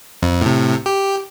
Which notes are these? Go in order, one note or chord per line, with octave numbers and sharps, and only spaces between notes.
F2
A2 C3
G4